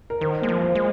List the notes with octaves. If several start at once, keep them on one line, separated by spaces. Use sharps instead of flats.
A#4
D#3 C5
G#3 A#3
F3
C5
G#3